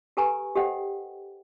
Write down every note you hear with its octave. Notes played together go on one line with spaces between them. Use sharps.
G4 A4 B4 G#5 A#5 C#6
G4 A4 C5 D#5 F#5 G5